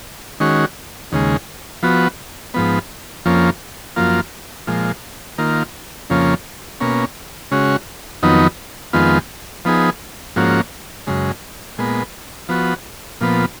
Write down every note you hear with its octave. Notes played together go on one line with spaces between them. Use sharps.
D#3 G#3 C#4 F#4
D#2 C#3 G#3
F3 B3 F#4
G#2 F3 B3
F2 F3 A#3 C#4
F#2 F3 A#3 F4
A#2 F3 G#3
D#3 A#3 F4
F2 C#3 F3 A#3 C#4
B2 A#3 C#4
C#3 G#3 C#4 F#4
F2 D#3 F#3 B3 D#4
F2 D#3 G#3 B3 F4
F3 B3 D#4 G#4
G#2 F3 A#3 C#4 F#4
F#2 C#3 G#3
A#2 G#3 B3
F3 B3 F#4
A#2 F3 B3